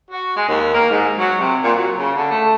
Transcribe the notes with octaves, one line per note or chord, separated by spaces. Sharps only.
F#4
G#3
D#2
A#3
G#2
F#3
C3
A#2
F#3
C#3
D3
A3